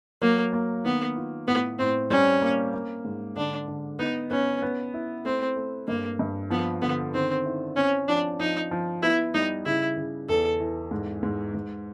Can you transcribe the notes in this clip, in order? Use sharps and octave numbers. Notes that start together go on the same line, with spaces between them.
F#3 A#3
A#3
D#3 B3
F4
A2 B3
A2 C4
G3 C#4
A#3
A#3
G#2
D3 D4
D3
B3 D#4
B3 C#4
B3
E4
A3 C4
A3
G2 A#3
G2
F3 B3
D3 B3
D#3 C4
E4
C4 C#4
F3 D4
F3 D#4
F3
B3 E4
G3 D#4
C#3 E4
C#3
E2 A4
E3
G#2
G#2
G#2